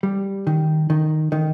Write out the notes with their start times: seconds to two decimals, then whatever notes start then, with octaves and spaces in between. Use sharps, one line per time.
0.03 G3
0.47 D#3
0.90 D#3
1.32 D#3